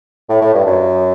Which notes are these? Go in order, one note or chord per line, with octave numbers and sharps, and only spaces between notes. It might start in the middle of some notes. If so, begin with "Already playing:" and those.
A2
A2
G2
F#2